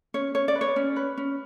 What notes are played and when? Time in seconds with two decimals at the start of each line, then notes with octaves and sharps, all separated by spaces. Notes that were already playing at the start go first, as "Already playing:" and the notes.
0.14 C#4 C#5
0.34 C#4 C#5
0.48 D5
0.55 B4
0.61 C#5
0.76 C#4
0.96 B4
1.17 C#4